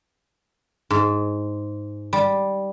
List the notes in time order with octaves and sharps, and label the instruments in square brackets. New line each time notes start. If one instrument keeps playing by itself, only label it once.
[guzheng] G#2
G3